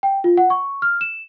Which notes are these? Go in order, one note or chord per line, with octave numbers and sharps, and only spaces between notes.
G5
F4
F#5
C#6
F6
E7